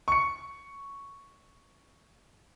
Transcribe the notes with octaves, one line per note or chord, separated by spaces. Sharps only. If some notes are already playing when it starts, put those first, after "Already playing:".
C#6 C#7